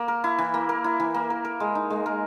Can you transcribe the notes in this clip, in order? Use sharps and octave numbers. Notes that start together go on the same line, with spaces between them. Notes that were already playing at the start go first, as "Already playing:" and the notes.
Already playing: A#3
A#4
E4
E3
A#3
A#4
E4
E3
A#3
A#4
A#4
G#3
D#4
G#3
A#4